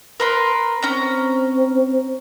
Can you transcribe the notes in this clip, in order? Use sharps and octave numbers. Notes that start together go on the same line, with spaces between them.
A#4 B4 C6
C4 C#4 A#5